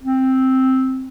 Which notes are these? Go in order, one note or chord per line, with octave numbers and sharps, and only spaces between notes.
C4